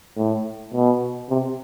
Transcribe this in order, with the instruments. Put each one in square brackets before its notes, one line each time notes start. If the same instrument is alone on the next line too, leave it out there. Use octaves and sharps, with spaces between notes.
[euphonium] A2
B2
C3